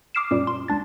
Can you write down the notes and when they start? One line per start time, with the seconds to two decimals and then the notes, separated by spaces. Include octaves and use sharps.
0.15 D6 D#6 F6 C7 D7 E7
0.31 F#2 A#2 G3
0.47 C6
0.68 C#2 D4 A6